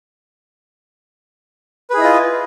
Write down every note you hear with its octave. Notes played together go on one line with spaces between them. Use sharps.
E4 F4 G#4 B4 D#5